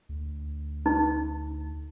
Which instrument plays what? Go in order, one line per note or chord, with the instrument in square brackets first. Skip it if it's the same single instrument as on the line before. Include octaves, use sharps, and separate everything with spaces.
[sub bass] D2
[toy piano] D#4